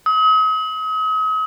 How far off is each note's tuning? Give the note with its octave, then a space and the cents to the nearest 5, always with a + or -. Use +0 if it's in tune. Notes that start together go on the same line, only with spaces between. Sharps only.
D#6 +40